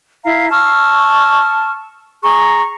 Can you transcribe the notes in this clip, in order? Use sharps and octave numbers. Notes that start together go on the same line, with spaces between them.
E4 F5 A#5
A5 C#6 E6 F6
G#4 A#5 C#6